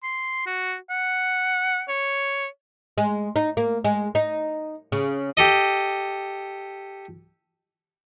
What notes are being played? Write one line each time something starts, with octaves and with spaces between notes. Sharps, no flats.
C6
F#4
F#5
C#5
G#3
D#4
A#3
G#3
D#4
C#3
G4 A4 D#5